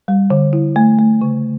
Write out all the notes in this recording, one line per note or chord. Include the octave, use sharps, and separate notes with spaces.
G3
D3
E4
A3
A3
C#3